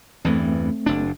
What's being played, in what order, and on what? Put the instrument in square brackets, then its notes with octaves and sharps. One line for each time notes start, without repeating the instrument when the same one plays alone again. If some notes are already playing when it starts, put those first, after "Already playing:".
[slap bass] E2 G2 E3 [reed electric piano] A3 C4
[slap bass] F#1 D4